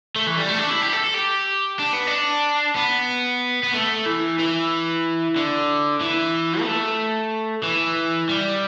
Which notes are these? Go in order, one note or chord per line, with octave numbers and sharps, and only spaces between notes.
A3
E3
G3
A3
D4
E4
G4
A4
A4
G4
D4
B3
D4
B3
B3
A3
E3
E3
D3
E3
B3
A3
E3
G3